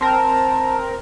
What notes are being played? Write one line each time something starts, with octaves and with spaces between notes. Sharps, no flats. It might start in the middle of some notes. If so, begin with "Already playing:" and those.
C4 A#4 A5